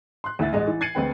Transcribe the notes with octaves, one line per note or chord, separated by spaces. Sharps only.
C6 F#6
D2 E3 E5 A6
A1 G#3 D#5
E3
G#6 A6 C7 C#7 D#7 F#7
D2 G#3 C4 B4 G5